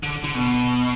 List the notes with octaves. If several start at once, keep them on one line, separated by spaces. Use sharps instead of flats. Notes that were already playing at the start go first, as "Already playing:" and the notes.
D3
D3
B2